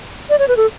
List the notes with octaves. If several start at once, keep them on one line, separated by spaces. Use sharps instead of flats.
D5
C#5
B4
A4